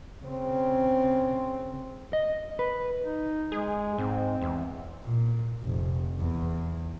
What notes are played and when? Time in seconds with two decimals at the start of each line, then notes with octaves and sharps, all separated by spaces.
0.25 C#3 C4
2.13 D#5
2.59 B4
3.03 D#4
3.52 G#3 G#4
3.98 G#2 C4
4.42 E2
5.03 A#2
5.63 F1
6.20 E2